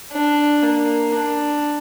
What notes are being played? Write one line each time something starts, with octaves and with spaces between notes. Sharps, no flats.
D4
A#3
D4